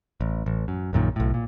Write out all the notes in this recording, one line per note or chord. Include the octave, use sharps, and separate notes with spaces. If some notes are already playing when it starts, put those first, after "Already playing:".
A1
A1
F#2
A#1 F#2 A#2 D#3
B1 A2
A#2